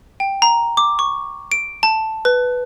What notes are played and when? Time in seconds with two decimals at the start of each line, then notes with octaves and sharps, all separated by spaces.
0.20 G5
0.42 A#5
0.77 D6
0.99 C#6
1.52 D7
1.83 A5
2.25 B4